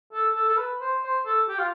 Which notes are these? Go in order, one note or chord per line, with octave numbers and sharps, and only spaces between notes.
A4
A4
A4
B4
C5
C5
A4
G4
F4